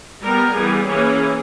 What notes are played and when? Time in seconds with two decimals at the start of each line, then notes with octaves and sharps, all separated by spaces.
0.22 G3 B3 A#4
0.54 E3 G3 B3 G#4
0.87 E3 A#3 C#4 G#4